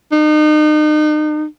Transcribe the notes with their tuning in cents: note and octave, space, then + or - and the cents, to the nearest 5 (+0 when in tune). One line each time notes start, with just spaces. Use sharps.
D#4 -35